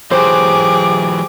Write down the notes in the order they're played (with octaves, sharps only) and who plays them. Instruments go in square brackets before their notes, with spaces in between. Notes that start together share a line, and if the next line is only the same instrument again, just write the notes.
[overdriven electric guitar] E3 F#3 [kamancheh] G4 G#4 [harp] C5 [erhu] D6